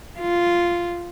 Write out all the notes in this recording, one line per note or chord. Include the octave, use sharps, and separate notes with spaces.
F4